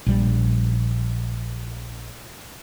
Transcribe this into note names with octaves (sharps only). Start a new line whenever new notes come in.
A#1 G3